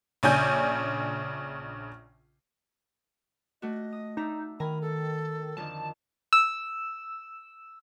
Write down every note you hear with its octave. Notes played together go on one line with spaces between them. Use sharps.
A#1 C#3 D4 G#5 G6
A3 D4 F#4 D#5
D#6
D4 D#4 E5 A#5
D#3 A#4 G#5 A#5 B5
A4
F2 D3 D#3 A5
E6